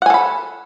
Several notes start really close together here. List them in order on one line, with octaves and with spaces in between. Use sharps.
F#5 G#5 A4 B5